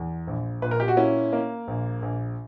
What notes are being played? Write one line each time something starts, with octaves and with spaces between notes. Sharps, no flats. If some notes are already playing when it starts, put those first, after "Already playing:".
Already playing: E2
A#1
A#2 B4
A#4
G4
F#4
A#3 C#4 E4
A#3
A#1
A#1